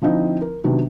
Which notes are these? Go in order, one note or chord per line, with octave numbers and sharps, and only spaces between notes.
D3 F3 C4 D#4 E4
A#4
C3 D#3 F#3 B3 D4